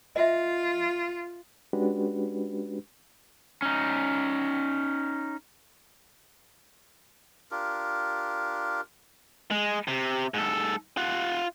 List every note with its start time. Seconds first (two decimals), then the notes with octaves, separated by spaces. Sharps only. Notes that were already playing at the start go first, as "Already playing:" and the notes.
0.16 F4 D#5 E5
1.73 G#3 C#4 D4 F#4 G4 B4
3.62 C#4 D#4
7.51 D4 F4 G4 A#4
9.51 G#3
9.88 C3
10.34 G#2 A4
10.97 F4 F#5